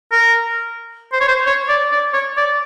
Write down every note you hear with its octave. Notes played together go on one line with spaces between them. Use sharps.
A#4
C5
C#5
C5
C#5
D5
D5
C#5
D5